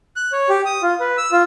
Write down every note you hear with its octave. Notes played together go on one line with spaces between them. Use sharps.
F#6
C#5
G4
D#6
F4
B4
E6
F4